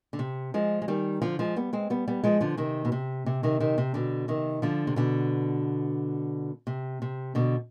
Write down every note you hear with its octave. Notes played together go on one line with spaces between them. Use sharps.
D3
C3
F3 G#3
G#3
D#3 G3
D3 F3
F3 G#3
G3 B3
G#3 C4
G3 B3
G3 B3
F3 G#3
D3 F3
C3 D#3
B2
C3
C3
C3 D#3
C3 D#3
C3
B2 D3
C3 D#3
D3 F3
C3
B2 D3
C3
C3
B2 D3